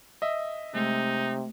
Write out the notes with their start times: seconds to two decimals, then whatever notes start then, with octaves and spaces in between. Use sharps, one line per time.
0.22 D#5 E5
0.74 C3 G#3 A3 D#4